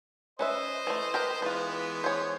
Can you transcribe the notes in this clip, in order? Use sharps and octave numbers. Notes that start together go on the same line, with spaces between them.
C#4 B4 C5 D#5 E5
E3 A3
G4 A#4 B4
E3 G#3 B3 F4 B4
C5 C#5